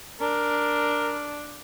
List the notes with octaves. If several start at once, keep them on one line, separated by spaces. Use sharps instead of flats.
D4 A#4